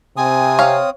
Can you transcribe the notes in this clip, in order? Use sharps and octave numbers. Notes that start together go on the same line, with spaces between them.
C3 C4 G#5 D#6
C#5 F5